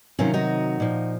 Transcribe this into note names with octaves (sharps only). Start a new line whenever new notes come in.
C3 D#3 F#3 C#4 F4
D#4 F#4
A#2 F3